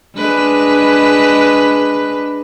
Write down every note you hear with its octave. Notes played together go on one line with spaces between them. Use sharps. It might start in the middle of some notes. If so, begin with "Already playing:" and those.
G#3 D4 B4